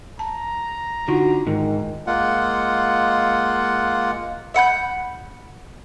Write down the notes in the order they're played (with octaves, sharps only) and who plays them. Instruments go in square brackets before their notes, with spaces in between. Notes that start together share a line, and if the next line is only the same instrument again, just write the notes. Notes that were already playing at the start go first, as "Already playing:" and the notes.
[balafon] A5 [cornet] A#5
[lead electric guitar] D3 [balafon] D#4 F4 [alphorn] F#4
[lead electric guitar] G#2 [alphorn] D#3
[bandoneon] G#3 A#3 F4 F#5
[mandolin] E5 F#5 B5 G6